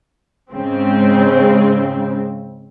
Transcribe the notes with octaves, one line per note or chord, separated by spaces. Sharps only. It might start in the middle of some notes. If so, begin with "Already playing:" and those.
G#2 C#3 C4